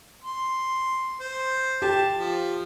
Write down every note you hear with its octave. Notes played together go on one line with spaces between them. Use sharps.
C6
C5
G4 A5
F3